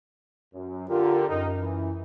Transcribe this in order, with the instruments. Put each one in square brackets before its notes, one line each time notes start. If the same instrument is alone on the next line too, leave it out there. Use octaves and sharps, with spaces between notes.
[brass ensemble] F#2
[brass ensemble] D3 G4 A#4 [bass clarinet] F4
[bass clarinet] F#2 [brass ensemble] D#4 A#4
[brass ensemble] E3